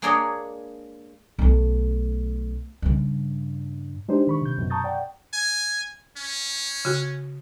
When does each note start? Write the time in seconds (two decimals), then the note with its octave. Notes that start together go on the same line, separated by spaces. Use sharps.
0.02 G#3 A#3 D4 G#4 C#5 D#5
1.39 B1 A3
2.82 G2 C#3
4.08 G#3 D4 D#4 G4 C5
4.27 D#3 B5 C#6
4.42 C3 G6
4.58 F#2 B2
4.70 A5 A#5 C#6 D#6 G6 A6
4.84 D5 F#5 G5
5.33 G#5
6.17 C#4
6.85 C#3 F#4